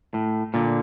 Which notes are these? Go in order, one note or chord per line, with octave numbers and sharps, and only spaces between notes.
A2
A#2 D3